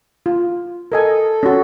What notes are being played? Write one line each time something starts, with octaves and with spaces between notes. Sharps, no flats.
F4
A4 A#4 D#5 G#5
C#4 F#4